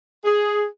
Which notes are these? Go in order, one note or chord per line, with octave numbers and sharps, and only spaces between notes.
G#4